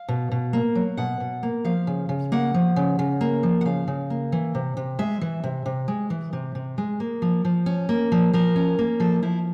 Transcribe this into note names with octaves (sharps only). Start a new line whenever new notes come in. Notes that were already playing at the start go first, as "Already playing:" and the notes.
Already playing: F5
B2
B2
A#3
F#3
B2 F#5
B2
A#3
F3 F5
C#3
C#3
A#3 F#5
F3
C#3
C#3
A#3
F3
F#5
C#3 F5
C#3
A#3
E3
C3
C3
G#3 E5
E3
C3
C3
G#3
E3
C3
C3
G#3
A#3
F3
F3
C#4
A#3
F3
F3 A#4
C#4
A#3
F3 A4
F3 E4